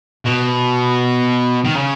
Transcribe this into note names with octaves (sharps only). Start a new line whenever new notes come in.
B2
D#3
C#3